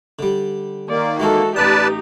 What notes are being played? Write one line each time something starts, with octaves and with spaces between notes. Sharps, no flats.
D3 G3
D#3 A#3 D5
E3 G#3 D#4 F#4 A4
A1 D#4 G4 B4 D5 A5 D#6